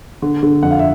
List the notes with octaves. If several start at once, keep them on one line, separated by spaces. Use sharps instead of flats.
D3
D3
F2 F#5
F5
E5